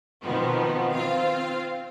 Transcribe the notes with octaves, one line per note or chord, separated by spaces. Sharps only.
B2 D#3 F3 B3 C4
C4 F4 F5